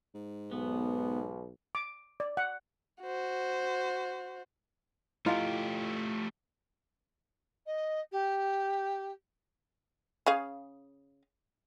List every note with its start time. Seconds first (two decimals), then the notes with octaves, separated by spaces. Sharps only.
0.15 G#2
0.51 B1 B3
1.75 D6
2.20 D5
2.37 F#5
3.01 F#4 C5
5.26 A3 E4 F4 G4 D#5 G#5
7.66 D#5
8.12 G4
10.26 C#3 G#4 F5